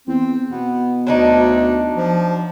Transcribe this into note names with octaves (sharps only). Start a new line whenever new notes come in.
E2 C4
B2 B3
D2 F#3 D4 D#4
F3